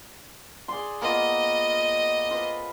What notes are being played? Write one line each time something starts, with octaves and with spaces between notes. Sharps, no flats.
G#4 D5 C6
A#3 B3 F4 D#5
F4 B4 C5